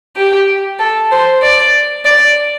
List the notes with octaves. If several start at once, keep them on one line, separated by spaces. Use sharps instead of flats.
G4
A4
C5
D5
D5